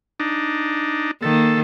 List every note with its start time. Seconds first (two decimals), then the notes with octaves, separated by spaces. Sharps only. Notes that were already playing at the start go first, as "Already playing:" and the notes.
0.20 D4 D#4
1.22 D#3 A#3 A4